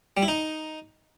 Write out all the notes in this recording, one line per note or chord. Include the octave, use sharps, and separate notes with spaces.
G3
E4
D#4